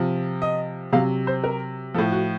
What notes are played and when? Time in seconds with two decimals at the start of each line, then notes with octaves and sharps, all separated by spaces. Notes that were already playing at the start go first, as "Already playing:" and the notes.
Already playing: C3 F3
0.42 D#5
0.93 C3 F#3 F5
1.27 C5
1.44 A#4
1.94 F3 A4
1.98 A2
2.12 F#4